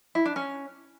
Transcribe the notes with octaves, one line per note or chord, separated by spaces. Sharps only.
E4
D4
C#4